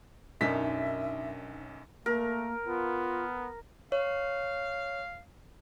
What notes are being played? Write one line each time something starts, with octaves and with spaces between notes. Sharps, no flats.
B1 F#2 D4 D#4 A#4 E5 B6
A3 A#3 A#4
B3 F4
C#5 F5